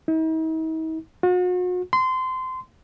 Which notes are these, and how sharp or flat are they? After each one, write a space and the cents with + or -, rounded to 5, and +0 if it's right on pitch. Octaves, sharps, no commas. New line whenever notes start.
D#4 +45
F#4 -40
C6 -20